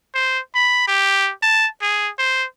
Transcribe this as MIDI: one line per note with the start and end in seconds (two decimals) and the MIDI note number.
0.15 0.39 72
0.55 0.86 83
0.87 1.31 67
1.42 1.67 81
1.82 2.10 68
2.19 2.45 72